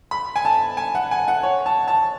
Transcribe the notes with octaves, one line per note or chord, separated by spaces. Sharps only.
B5
G#5
A5
G#5
F#5
G#5
F#5
C#5
A5
A5